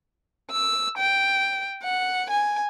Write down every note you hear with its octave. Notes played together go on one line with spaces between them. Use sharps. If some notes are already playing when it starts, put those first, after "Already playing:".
E6
G5
F#5
G#5